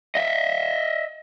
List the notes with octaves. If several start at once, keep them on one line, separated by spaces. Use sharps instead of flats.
D#5 E5